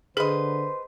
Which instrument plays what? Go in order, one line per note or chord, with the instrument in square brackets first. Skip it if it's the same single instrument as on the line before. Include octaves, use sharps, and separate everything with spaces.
[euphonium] D3 [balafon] G#4 [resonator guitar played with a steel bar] B4 D#5 [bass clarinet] C5